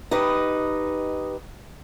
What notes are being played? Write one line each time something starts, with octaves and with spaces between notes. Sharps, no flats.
D#4 G4 B4 D#5